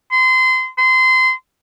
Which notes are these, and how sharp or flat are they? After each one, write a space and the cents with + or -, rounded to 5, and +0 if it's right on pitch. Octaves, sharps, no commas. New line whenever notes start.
C6 -25
C6 -25